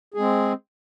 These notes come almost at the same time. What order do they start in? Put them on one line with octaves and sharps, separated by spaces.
G#4 G#3 C4